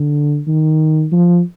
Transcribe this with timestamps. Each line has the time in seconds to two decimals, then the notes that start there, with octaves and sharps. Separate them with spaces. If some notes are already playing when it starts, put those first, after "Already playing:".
Already playing: D3
0.47 D#3
1.12 F3